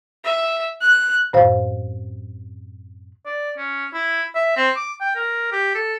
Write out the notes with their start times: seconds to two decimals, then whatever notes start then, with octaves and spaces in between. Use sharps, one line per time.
0.24 E5
0.81 F#6
1.33 F#2 A2 C4 C5 F5
3.26 D5
3.58 C#4
3.94 E4
4.35 E5
4.57 C4
4.76 D6
5.01 G5
5.15 A#4
5.52 G4
5.75 A4